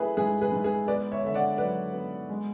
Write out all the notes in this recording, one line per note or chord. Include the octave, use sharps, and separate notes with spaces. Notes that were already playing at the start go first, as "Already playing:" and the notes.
Already playing: A3 E4 G#4 B4
G#2 G#4 B4
G#4 B4
G#2
G#4 B4
B3 B4 D5
C#5 E5
D3 E5
D5 F#5
F#3 B4 D5
B3
G#3